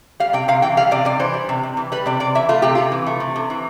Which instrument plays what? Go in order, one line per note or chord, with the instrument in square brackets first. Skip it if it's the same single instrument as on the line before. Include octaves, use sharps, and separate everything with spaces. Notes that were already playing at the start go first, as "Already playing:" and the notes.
[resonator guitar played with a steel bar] G3 F5
C3 G5
C3 F5
E3 G5
G3 F5
C3 D5
C3 D5
E3 C5
G3
C3
C3
E3
G3 B4
C3 D5
C3 D5
E3 E5
A3 F4
C3 G4
C3 F4
E3
A3
C3
C3
E3